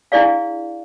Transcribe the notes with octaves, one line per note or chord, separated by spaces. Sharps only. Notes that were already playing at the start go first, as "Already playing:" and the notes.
D4 E4 G#4 D5 F5